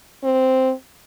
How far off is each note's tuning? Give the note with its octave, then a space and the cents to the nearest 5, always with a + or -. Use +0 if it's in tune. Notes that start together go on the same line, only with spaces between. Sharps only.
C4 -5